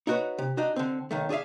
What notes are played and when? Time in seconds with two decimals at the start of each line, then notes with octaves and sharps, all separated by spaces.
0.07 D#4 E4 F#4 G4 B4 C#5
0.38 C3
0.57 D4 D#4 F#4
0.76 D3 C4
1.11 B1 D#3 A3
1.29 D4 G#4 C#5 E5 F5